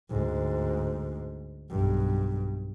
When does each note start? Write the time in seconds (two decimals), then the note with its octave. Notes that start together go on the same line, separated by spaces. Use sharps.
0.10 D2 G#2
1.70 B1 G2